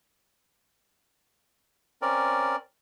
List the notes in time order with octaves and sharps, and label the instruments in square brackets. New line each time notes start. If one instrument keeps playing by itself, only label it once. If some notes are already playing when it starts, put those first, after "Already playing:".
[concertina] C4 C#4 A#4 D5